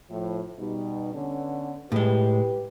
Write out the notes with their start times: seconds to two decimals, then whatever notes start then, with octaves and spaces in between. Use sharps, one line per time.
0.11 A2 F3
0.59 B2 G3 D#4
1.15 D3 B3 C#4
1.92 A2 G#3 G4 B4